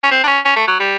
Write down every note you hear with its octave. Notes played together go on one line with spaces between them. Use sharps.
C#4
C4
D4
C#4
C#4
A3
F#3
G3